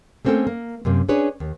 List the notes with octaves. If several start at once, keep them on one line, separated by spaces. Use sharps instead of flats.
A3 A#3 C4 C#4 A4 G5
A#3
F#2 C3 A#3
C#4 D4 G#4 B4 C#5
D#2